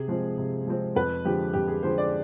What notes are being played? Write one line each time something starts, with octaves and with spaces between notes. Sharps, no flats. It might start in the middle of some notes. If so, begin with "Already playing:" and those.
Already playing: C3 G#4
F3 G#3 C4
C3
F3 G#3 C4
F2 B4
D3 F3 G#3 G4
F2 G4
G#4
D3 F3 G#3 C5
D5